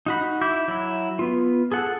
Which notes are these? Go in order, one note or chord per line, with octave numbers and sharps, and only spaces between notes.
D#4 F#4 B5
E4 E5 D6 G6
F#3 E4
B3 F4
G#4 A4 F#5